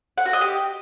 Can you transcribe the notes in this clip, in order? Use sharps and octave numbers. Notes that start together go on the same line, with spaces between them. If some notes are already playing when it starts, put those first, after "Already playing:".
F#5
F#4
D#5
G4